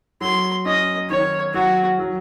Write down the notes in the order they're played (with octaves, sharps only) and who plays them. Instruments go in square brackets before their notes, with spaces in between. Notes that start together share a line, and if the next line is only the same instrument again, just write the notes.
[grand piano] F#3 [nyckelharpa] C6
[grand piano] C#4 [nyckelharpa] D#5
[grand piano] D#3 [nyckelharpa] C#5
[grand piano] F#3 [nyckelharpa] F#4
[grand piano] F#3